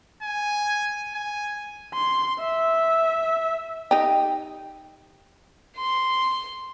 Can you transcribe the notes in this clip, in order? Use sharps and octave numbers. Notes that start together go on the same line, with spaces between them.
G#5
G#5
C6
E5
D#4 G4
C6